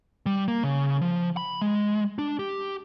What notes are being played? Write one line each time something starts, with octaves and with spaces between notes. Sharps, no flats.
G3
A#3
C#3
F3
B5
G#3
D4
G4